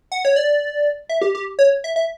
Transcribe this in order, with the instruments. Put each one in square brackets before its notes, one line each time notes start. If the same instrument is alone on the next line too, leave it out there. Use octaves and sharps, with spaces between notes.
[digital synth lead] F#5
C#5
D5
E5
G4
G4
C#5
E5
E5